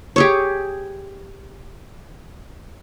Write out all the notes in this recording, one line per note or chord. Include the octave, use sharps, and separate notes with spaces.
G4 G#4 C#5